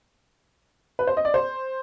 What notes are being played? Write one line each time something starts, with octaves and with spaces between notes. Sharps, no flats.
B4
C5
D#5
D5
C5